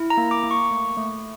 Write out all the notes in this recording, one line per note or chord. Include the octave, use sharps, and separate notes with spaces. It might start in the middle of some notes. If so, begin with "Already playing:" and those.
Already playing: E4
A#5
A#3
D6
A#3
C#6
A3
A3